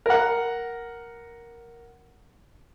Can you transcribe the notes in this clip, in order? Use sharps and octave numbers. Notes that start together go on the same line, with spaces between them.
A#4 F#5